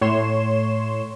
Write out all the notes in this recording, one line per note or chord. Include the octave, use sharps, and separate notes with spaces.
A2 C#5 C6 E7